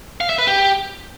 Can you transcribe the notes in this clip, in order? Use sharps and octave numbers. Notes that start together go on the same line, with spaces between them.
F5
E5
B4
G4